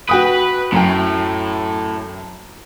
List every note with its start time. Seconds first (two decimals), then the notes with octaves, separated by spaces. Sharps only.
0.09 F#4 B4 G5 D#6
0.72 F#2 A2 G5